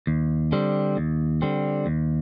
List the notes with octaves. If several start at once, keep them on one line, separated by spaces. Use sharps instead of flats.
D#2
D3 G3 C4
D#2
D3 G3 C4
D#2